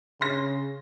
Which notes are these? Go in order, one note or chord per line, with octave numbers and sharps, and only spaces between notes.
C#3 C6 A#6